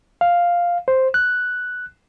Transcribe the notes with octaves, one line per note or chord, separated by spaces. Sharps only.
F5
C5
F#6